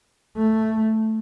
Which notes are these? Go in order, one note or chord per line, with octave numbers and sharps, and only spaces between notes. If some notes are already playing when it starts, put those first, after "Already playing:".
A3